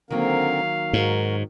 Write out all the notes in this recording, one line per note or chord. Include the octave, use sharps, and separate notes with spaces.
D3 D#3 F#3 A#3 C4 A#4 F5
G#2 F#4 A#4